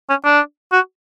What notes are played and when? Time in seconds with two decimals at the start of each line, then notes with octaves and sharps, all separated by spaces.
0.10 C#4
0.25 D4
0.72 F#4